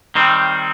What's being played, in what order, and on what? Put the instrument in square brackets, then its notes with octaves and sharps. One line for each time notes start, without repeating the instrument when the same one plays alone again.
[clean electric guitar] D#3 G3 C4